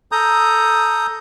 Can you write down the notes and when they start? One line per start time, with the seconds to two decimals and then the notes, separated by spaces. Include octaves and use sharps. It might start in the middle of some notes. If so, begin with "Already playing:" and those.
0.12 A4 A#5 D#6 G6